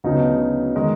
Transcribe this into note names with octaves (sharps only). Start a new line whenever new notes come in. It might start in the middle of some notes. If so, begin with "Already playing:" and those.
D2 C#3 F#3 B3 D#4
D#3 G#3